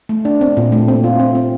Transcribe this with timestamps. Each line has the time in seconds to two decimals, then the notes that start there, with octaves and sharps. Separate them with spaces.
0.09 A3
0.25 D4
0.41 C4
0.57 A#2
0.72 A3
0.88 C4
1.04 F4
1.19 C4
1.35 C4